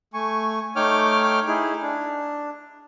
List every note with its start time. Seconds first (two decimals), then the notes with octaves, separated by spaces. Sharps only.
0.14 A3 G#5 C#6
0.76 A3 D#4 C#5 G5 D6 F6
1.47 D#4 E4 G#4
1.82 D4